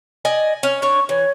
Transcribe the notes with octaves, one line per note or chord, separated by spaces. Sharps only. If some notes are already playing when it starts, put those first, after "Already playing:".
D5 D#5 G#5
C#4
D4 C#5 C#6
E3 C#5